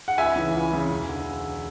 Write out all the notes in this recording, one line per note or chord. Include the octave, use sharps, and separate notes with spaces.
F#5
C#2 E5 G#5
C#3 E3
C#2
C#3 E3
E1
D3